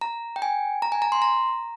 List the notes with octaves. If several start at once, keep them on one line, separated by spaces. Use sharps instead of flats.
A#5
G5
G#5
A#5
G#5
A#5
C6
A#5